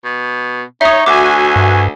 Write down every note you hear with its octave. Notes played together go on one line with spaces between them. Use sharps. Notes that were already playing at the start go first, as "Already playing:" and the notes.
B2
D#4 C#5 E5 D#6
D2 F#4 G#5 D6
G2